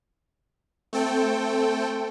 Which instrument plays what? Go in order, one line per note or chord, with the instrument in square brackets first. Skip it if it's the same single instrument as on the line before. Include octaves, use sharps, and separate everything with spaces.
[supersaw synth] A3 C4 A4 G5